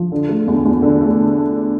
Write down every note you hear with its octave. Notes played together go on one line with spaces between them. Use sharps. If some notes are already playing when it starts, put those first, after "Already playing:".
Already playing: F3
D3
A3
E2
E2
D3
A3